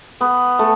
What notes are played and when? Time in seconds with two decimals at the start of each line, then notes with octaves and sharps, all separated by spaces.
0.21 B3
0.59 A3